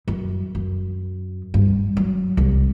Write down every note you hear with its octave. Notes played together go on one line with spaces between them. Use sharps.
F#2
F#2
G2
F#3
C2